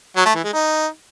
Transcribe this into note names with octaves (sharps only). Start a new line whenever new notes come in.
F#3
A3
E3
G#3
D#4